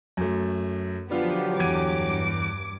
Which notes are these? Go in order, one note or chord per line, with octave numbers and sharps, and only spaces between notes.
F#2 A3
D3 F3 F#3 B3 D4 F4 G4
E2 G2 D6 G#6 D#7